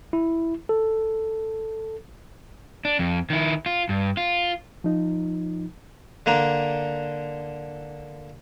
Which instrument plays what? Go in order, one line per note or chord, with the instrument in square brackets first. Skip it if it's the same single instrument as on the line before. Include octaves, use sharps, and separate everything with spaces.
[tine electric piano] E4
A4
[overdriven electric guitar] D4
F2
D#3 E4
F4
G2
F4
[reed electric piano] F3 D#4 F4
[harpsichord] D3 A#3 D4 A#5